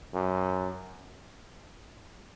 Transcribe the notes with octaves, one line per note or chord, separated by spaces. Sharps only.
F#2